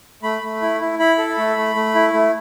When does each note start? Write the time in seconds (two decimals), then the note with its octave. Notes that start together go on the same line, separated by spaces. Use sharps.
0.23 A3 B5
0.43 A3
0.62 E4
0.80 E4
0.99 E4 B5
1.18 A4
1.37 A3
1.56 A3
1.75 A3
1.95 E4
2.13 A3